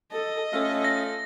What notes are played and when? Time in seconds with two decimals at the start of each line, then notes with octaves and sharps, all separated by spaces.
0.12 A4 D#5
0.53 A3 C#4 F4 A4
0.84 A#6